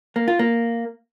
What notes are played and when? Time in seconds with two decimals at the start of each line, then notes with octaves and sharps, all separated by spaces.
0.16 A#3
0.28 F4
0.39 A#3